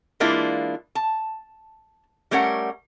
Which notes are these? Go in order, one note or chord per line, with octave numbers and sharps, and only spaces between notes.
E3 G#3 A#3 D4 E4 F4
A5
G3 A3 C#4 A#4 C#5 F#5